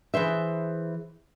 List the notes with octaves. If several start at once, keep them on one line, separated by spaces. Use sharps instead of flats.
E3 G#4 C5 E5